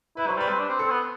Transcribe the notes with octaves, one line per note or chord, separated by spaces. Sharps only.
E4 B4
F#3 C5
G3 B4
C4
D4
C4
C4 A4
B3